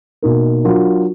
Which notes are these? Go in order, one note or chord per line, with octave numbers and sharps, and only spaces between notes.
B2 A#3 D#4 A#4
F#3 D4 F4 A#4